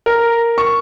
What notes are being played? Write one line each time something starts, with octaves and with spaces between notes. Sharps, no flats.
A#4
C#6